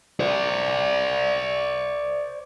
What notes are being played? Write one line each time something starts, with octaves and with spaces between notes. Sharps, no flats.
C5 D5